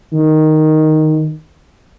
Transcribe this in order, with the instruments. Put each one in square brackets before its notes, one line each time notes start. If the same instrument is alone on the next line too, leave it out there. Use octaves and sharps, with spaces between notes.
[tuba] D#3